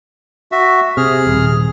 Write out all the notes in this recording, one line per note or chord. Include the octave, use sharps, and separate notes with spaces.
F#4 E5
C3 G#4 F6
D#1